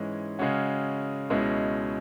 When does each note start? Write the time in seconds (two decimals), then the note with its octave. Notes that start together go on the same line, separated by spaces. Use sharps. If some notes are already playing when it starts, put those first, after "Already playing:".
Already playing: G#2 E3 G#3 C#4
0.39 C#3 G#3 C#4 F#4
1.30 C#2 B2 G#3 C#4 E4